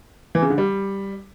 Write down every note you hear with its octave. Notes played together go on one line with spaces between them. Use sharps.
E3
C#3
D3
G3